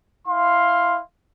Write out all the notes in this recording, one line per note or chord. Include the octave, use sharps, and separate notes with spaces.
E4 F5 C6